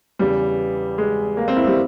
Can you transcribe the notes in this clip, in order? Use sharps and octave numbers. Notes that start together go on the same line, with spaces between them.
E2 C#3 E3 G3
G#3
A#3
C4
E4
G3